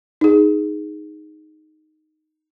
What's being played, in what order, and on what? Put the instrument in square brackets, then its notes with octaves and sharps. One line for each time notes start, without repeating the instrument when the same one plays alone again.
[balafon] D#4 G#4